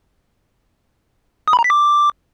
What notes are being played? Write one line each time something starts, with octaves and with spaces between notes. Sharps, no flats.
D#6
B5
A#5
B6
D6